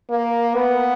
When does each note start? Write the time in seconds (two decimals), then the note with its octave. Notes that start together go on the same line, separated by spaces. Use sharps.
0.10 A#3
0.54 B3